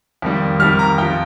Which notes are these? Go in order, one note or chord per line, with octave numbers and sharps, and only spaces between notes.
F2 D#3 G3
F2 D#3 G3 F6
A#5
F2 F3 G5